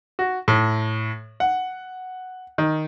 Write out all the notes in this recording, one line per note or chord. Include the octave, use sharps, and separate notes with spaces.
F#4
A2
F#5
D#3